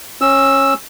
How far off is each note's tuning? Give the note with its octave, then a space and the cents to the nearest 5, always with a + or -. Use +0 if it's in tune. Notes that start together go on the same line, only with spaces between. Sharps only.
C#4 -20 E6 +0